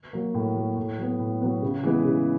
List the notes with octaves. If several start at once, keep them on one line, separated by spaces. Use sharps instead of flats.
F#3 A#3
A2
F#3 A#3
A2
F#3 B3
A2
F#3 B3
C#3
E3 G#3 B3
C#3